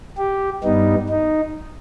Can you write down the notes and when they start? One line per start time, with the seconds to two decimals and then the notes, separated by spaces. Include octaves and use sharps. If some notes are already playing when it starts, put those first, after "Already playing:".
0.18 G4
0.63 G2 G3 B3 D#4
1.09 D#4